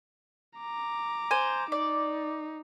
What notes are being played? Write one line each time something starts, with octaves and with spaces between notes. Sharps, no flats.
A#5 D6
C5 G#5
D#4 D5